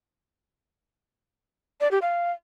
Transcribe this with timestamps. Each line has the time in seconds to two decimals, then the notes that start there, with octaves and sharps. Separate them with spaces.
1.81 D5
1.91 G4
2.02 F5